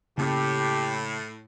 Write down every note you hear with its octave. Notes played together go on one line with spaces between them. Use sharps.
A2 C#3 A#3 C#4 G4